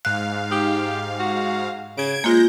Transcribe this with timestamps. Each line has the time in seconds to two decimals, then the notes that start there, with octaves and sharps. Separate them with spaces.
0.05 G#2 F5 F#6
0.51 D#4 G4
1.19 F#4
1.98 C#3 G#6 D7
2.24 G#3 A#3 F4 G6 A#6